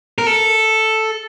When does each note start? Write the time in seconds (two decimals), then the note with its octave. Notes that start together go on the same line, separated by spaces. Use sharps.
0.18 A#4
0.27 A4